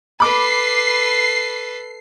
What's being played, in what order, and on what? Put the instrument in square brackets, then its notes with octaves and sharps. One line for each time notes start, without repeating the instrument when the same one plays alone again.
[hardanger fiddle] A4 B4 [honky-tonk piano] B5 D6 [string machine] C7